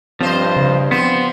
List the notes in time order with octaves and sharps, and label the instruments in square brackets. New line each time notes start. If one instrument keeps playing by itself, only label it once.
[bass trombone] G2 [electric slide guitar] F3 [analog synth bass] C4 [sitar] F4 C5 D#5
[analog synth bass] C#3
[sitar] F3 C5 [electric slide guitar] B3 [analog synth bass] C4